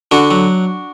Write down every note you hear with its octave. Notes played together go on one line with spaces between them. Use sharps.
D3 D4 F#4
F#3